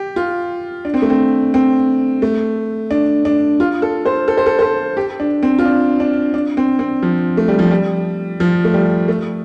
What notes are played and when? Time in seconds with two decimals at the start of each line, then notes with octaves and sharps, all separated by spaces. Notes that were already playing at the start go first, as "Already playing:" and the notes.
Already playing: G4
0.16 F4
0.85 D4
0.94 C4
1.02 A3
1.10 C4
1.54 C4
2.22 A3
2.91 D4
3.25 D4
3.60 F4
3.82 A4
4.05 C5
4.28 A4
4.37 C5
4.46 A4
4.59 C5
4.62 A4
4.97 G4
5.20 D4
5.43 C4
5.58 F4
5.65 D4
6.00 D4
6.34 D4
6.57 C4
6.79 C4
7.02 F3
7.37 A3
7.48 G3
7.59 F3
7.71 G3
8.40 F3
8.65 A3
8.74 G3
9.08 A3